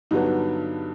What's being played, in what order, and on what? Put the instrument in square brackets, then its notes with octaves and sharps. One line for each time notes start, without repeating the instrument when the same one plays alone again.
[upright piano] G2 D3 F#3 B3 D#4